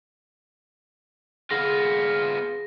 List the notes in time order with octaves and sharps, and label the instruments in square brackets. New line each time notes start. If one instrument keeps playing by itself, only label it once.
[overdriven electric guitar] B3 F4 [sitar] G#4 [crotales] A#6